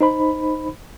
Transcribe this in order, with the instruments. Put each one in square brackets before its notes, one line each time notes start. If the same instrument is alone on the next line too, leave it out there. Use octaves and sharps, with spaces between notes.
[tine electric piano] D#4 C5 B5